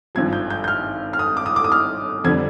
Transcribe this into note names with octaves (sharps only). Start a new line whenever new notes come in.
G#1 G2 F3 G#6
G6
G6
G6
F6
F6
D#6
D6
D#6
D6
D#6
F6
F2 D3 G3 G#6